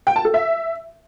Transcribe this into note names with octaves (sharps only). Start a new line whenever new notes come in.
G5
A5
A4
E5